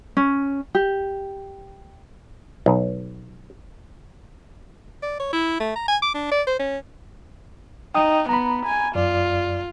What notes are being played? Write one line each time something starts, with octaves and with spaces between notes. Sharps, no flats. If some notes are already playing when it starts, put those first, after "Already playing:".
C#4
G4
B1
D5
C#5
E4
A3
A#5
G#5
D6
D4
D5
C5
C#4
D#4 G5 D#6
B3 A#5 B5
G#5
F#2 F4 D5